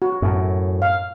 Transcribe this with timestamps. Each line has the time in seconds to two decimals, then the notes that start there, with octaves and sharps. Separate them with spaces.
0.02 F#4
0.22 F#2 A2
0.82 F5